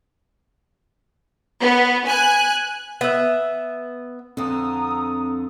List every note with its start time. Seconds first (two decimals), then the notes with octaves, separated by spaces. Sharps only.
1.61 B3
2.07 G#5 F#6
3.01 B3 E5
4.37 F2 D3 C4 A#5 D#6